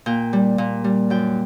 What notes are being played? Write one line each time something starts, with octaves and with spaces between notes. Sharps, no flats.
A#2 G5
G3
A#2
G3
F#2 G5